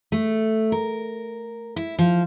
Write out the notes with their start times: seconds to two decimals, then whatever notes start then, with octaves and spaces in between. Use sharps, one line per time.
0.12 A3
0.72 A#4
1.76 E4
1.99 F3